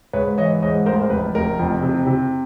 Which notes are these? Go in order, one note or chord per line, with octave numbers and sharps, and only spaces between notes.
G#2 B4 C#5
E3 C#5 D#5
G#2 C#5 D#5
A1 A#4 C5
A#4
F1 B4
F1 A#4
F2
C3
C3